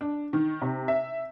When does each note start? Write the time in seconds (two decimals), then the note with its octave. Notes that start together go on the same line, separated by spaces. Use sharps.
0.01 D4
0.33 D#3
0.62 C3
0.88 E5